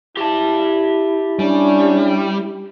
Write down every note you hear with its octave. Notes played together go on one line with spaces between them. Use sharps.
E4 G4 A5
G3 C#4 D4